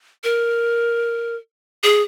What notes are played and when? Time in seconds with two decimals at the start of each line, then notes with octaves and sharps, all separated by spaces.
0.24 A#4
1.83 G#4